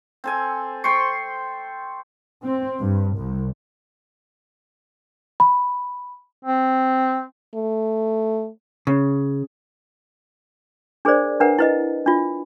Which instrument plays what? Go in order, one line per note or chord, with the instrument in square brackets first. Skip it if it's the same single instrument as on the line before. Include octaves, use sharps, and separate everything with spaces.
[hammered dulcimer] C4 A4 G#5
C5 G5 C6 C#6
[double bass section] C4
G2
C2
[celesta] B5
[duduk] C4
[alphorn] A3
[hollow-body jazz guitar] C#3
[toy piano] D4 G#4 A#4 C5 D5
D4 A#4 B4 F#5 A#5
E4 B4 D#5
D4 F4